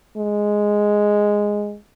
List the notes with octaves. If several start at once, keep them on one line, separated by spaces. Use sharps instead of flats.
G#3